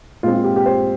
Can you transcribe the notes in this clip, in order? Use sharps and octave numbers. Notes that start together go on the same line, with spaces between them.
A#2 G#3 C4 F4
F4
G4
G4
C5